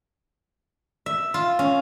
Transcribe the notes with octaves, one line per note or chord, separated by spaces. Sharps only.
E5
F4
C#4